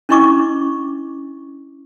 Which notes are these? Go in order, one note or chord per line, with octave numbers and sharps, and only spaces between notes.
C#4 D4 E4 D#5 C#6 D6